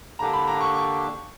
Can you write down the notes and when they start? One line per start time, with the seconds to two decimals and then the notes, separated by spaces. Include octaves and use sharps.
0.19 D3 A#3 D4 G4 A#5
0.33 B5
0.48 A#5
0.61 C#6
0.74 C#6